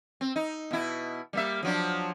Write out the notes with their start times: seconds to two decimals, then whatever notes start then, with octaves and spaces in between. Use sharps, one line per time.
0.21 C4
0.36 D#4
0.71 B2 E4
1.33 G3 A#3 E5
1.63 F3 F#3 D4